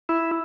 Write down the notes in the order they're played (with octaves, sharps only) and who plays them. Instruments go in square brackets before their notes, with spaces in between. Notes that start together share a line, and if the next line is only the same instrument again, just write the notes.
[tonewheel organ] E4